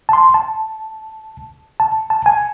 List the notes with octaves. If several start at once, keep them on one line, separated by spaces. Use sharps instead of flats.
A5
C6
A5
A5
A5
G#5